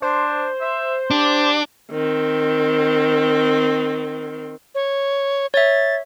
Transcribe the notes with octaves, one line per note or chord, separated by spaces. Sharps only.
D4 C5
E5
D4 G4
D#3 C4
C#5
C#5 E5 A6